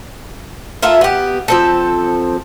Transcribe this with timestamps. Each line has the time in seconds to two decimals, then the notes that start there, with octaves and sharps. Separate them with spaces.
0.82 F4 A4 A#4 E5
1.01 B3 G4
1.48 F3 C4 A4